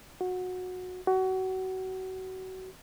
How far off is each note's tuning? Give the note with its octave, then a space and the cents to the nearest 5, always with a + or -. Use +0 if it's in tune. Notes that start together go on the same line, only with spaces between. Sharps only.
F#4 -20
F#4 +25